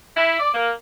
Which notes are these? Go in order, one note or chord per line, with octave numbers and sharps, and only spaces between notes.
E4
D5
A#3